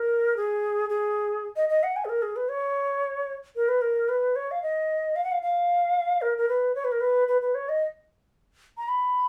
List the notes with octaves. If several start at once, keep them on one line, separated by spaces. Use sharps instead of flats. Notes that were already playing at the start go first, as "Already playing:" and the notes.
Already playing: A#4
G#4
G#4
D#5
D#5
F#5
G#5
G#4
A#4
G#4
B4
C#5
A#4
B4
A#4
B4
C#5
F5
D#5
F5
F#5
F5
F5
A#4
A#4
B4
C#5
B4
A#4
B4
B4
B4
C#5
D#5
A#5
B5